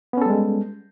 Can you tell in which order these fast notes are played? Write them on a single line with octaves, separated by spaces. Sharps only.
B3 C#4 A4 G3 G#3